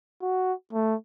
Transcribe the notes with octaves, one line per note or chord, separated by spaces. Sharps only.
F#4
A3